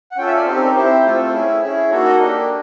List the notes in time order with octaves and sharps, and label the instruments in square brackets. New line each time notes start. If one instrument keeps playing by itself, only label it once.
[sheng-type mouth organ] F#5
C#4 F4 A4 G5
E5
D5
C4 D#4 G4 C5
A4
A#4
C4 E4 G4 C5
A3 C4 F4 A4
C#4 E4 G#4
C#4 E4 G#4
A#3 D#4 F#4 A4 C#5
D#5
A#3 D4 G4